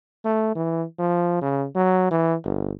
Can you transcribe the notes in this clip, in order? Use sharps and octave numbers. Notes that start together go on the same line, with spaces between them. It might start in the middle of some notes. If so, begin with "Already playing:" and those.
A3
E3
F3
C#3
F#3
E3
G1